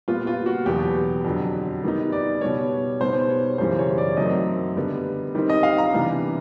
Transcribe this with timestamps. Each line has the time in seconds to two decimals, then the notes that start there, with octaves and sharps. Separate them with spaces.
0.08 A#2 G3 B3 F4
0.27 F4
0.46 F#4
0.66 E2 B2 F#3 B3 G4
1.25 F2 D3 F#3
1.84 D#3 G3 B3 D#4
2.12 D5
2.41 B2 G3 B3 C#5
3.00 B2 G3 B3 D#4 C5
3.30 C#5
3.58 F#2 C#3 E3 G3 C5
3.79 C#5
3.98 D5
4.17 F#2 D#3 F#3 A3 C4 D#5
4.77 D3 G3 B3
5.34 D#3 G3 C4 D#4
5.50 D#5
5.63 F5
5.78 A#5
5.93 C3 E3 G3 B3 D4